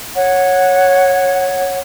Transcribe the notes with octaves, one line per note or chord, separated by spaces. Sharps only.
C#5 F#5